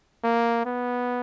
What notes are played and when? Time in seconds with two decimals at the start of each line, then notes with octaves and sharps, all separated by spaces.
0.24 A#3
0.65 B3